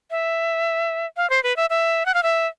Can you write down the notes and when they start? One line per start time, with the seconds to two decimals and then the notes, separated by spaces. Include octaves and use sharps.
0.11 E5
1.17 F5
1.30 C5
1.43 B4
1.57 E5
1.70 E5
2.06 F#5
2.14 F5
2.23 E5